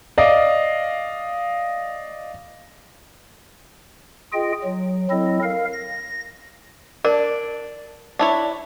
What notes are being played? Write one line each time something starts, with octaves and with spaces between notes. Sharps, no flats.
D5 D#5 F5
F4 G#4 D#5 G5
F#3
F#3 C4 E4 A4 D#5
A#4 F5
A#6
D4 A#4 D5
D4 E4 C#5